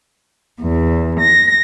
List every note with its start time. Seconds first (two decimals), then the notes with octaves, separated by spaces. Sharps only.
0.62 E2
1.19 A#6